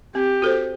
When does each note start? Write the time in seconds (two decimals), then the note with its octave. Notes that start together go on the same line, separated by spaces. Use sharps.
0.15 C4 G4
0.42 F#4 A4 C5